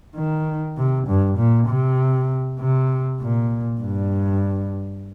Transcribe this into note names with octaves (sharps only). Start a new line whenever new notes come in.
D#3
C3
G2
A#2
C3
C3
A#2
G2